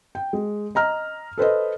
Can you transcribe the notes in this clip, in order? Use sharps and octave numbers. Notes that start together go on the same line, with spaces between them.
G5
G#3
D#5 A#5 F6
A4 B4 C5 D#5